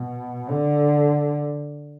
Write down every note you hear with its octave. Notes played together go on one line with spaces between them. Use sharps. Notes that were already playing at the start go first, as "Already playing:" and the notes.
Already playing: B2
D3